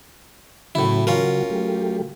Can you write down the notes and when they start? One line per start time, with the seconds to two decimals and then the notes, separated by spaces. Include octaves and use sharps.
0.75 A2 C#3 F#3 E4 F#4
1.07 C#4 F4 A#4
1.50 F#3 A3 G4